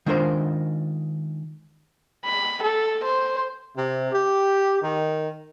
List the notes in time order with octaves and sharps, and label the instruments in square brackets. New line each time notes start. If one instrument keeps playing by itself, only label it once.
[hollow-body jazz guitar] D#3 G#3 D4 F4 A#4 C5
[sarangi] B5
A4
C5
[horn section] C3
G4
D#3